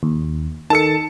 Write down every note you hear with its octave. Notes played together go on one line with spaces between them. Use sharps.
D#2
D#3 A4 A5 C#7